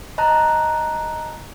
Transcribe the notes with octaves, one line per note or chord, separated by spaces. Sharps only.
D#5 A5 A#5 F#6